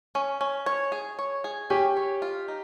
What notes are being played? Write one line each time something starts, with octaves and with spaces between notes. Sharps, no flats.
C#4
C#4
C#5
G#4
C#5
G#4
C#4 G4
C#5
F4
D#4